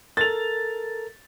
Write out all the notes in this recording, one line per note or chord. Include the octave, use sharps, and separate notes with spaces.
A4 A#4 A6 F7